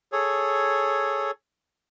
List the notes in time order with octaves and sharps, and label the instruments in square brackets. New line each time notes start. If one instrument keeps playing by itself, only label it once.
[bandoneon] G#4 A4 C#5